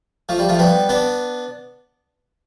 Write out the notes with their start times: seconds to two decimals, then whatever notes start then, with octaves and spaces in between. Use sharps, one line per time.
0.29 F3 A3
0.39 G3
0.49 F3 A3
0.59 G3 B3
0.89 B3 D4